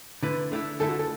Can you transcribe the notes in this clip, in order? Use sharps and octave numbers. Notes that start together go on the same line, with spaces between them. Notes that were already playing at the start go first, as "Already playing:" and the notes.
D3 A3 E4 B4
D3 A3 E4
D3 A3 E4 A4
F#4
A4